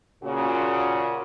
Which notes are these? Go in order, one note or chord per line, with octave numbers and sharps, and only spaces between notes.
A#2 C#3 F#4